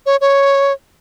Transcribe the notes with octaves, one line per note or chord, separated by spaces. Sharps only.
C#5
C#5